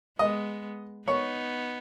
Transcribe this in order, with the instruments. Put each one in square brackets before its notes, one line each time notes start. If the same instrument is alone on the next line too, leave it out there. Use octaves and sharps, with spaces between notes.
[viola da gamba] G#3 B3 [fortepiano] D#5
[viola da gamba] B3 D#4 [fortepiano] C#5